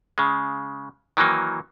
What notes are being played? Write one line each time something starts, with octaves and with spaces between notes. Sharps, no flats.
C#3 G#3
D#3 E3 F#3 A#3 D#4